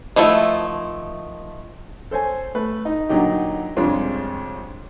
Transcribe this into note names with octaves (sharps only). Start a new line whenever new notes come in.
D#3 F3 A3 E4
A4 C5 C#5 G#5
A3 B4
D#4
A#2 D3 F#3 D#4 G4
C2 F2 G#3 C#4 D4 F4